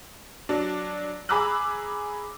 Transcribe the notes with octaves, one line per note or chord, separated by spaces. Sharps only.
F#3 D4
G#4 A#5 B5 D6 E6 F#6